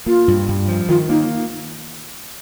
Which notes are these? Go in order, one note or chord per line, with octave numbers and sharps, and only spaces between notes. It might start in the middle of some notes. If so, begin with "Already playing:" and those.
A#3 F4
G2
G2
F3
D#3 F4
A#3 D#4